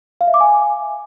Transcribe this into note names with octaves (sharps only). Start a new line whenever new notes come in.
F5
E5
D6
G#5